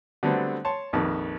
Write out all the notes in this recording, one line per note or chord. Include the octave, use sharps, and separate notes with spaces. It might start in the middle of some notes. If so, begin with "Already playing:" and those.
D3 F#3 G3 A3 B3 C4
C#5 A5 C6
A#1 F2 D#3 B4 A5